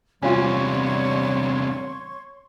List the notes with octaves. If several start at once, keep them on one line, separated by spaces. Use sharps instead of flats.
E2 C3 G3 C#4 F4 C#5 C6 C#6